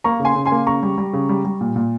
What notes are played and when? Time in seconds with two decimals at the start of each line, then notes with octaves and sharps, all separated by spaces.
0.04 A#3 A#5 C#6
0.20 C#3
0.25 G#5 C6
0.35 C#3
0.46 G#5 C6
0.52 A#3
0.67 C#3 A#5 C#6
0.83 G3
0.98 G3
1.13 C#3
1.29 G3
1.45 G3
1.61 A#2
1.76 A#2